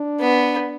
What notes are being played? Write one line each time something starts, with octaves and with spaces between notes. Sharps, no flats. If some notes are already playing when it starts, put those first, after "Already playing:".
Already playing: D4
B3